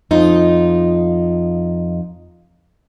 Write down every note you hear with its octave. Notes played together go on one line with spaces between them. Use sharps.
F2 D#4 F4